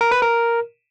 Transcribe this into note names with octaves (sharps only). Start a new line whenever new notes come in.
A#4
B4
A#4